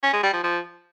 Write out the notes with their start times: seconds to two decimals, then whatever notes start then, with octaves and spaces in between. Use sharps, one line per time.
0.03 C#4
0.13 G#3
0.23 G3
0.33 F3
0.44 F3